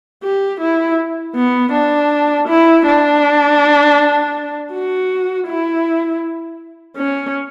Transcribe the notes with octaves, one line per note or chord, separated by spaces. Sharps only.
G4
E4
B3
D4
E4
D4
F#4
E4
C#4